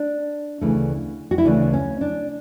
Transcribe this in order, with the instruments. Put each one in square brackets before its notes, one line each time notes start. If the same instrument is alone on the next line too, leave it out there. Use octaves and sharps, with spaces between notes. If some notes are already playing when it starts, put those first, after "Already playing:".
Already playing: [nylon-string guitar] D4
D2 C#3 E3 A3
F#4
E4
D2 C#3 E3 A3 D4
C#4
D4